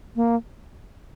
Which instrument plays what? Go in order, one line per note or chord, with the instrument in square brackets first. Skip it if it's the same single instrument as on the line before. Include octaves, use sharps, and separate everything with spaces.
[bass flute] A#3